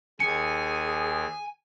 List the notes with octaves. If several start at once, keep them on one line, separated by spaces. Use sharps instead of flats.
D#2 G#4 G#5 C#7